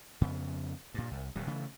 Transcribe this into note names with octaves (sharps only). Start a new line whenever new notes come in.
F2 C#3 B3
G2 A#2
C2
D1 D#2 C3 G3
C#3 E3 A3